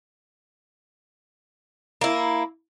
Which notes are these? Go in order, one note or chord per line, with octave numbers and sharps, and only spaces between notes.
A#3 E4